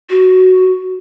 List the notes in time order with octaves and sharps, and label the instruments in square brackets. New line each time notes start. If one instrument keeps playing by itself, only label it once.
[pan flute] F#4